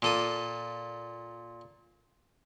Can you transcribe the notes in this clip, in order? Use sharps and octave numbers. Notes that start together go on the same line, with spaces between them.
A#2 A4 D#6